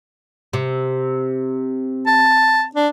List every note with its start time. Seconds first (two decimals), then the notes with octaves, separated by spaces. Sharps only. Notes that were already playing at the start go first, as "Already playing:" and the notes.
0.53 C3
2.07 A5
2.75 D4